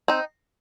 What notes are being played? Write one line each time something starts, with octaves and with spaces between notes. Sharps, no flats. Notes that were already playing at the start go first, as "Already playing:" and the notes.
C4 D#4